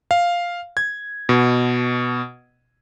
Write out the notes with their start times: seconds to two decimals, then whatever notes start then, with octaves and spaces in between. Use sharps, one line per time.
0.11 F5
0.77 G#6
1.29 B2